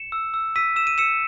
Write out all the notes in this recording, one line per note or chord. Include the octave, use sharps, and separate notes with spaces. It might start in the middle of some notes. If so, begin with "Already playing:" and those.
Already playing: C#7 E7
E6
E6
E6 B6 D#7
E6 E7
D#7
E6 C#7 E7